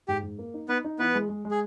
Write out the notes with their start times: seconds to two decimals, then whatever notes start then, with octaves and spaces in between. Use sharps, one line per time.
0.08 G#2 G4
0.23 G#2
0.39 A#3
0.54 D#4
0.69 B3 D#4 B4
0.84 D#4
0.99 E3 B3 B4
1.14 G#3
1.29 G#3
1.45 G#3
1.51 G#4